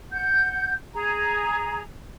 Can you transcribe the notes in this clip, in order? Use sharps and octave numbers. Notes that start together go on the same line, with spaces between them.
F#5 G6
G#4 A#5